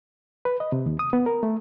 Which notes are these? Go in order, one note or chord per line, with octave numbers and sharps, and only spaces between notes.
B4
D#5
C3
D#2
D#6
B3
A#4
A3